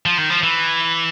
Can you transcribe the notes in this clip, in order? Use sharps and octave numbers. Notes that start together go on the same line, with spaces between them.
F3
D#3
F3
E3